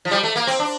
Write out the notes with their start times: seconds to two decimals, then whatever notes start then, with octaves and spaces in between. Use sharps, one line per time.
0.05 F3
0.11 G3
0.23 A3
0.36 A#3
0.47 C4
0.59 D4